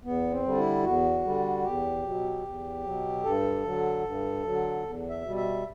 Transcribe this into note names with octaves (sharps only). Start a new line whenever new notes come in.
E2 B3
C4
D3 G3
E4
E2 F#4
D3 G3
E2 G4
B2 F#3
E2
B2 F#3
G2 A4
D3 F#3
G2
D3 F#3
E2
E5
B2 G3
E5